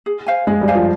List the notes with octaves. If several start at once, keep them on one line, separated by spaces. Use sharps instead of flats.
G#4
C5 F5 G#5
G#3 G#4
G3
C5 F5 G#5
F3